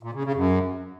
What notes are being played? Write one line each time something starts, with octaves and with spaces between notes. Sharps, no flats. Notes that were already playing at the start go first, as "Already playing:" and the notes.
A#2
C#3
C#3
F#2